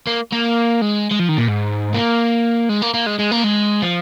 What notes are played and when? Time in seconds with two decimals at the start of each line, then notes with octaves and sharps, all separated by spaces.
0.07 A#3
0.32 A#3
0.81 G#3
1.11 G#3
1.19 F3
1.28 D#3
1.37 A#2
1.48 G#2
1.94 A#3
2.69 G#3
2.82 A#3
2.94 A#3
3.07 G#3
3.19 G#3
3.32 A#3
3.44 G#3
3.82 F3